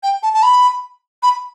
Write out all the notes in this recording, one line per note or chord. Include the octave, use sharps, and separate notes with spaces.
G5
A5
A5
B5
B5